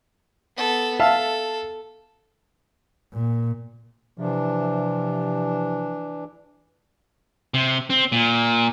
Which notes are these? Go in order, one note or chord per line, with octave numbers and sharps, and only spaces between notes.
B3 A4
A4 E5 F5 A5
A#2
C3 E3 F3 D4
C3
C4
A#2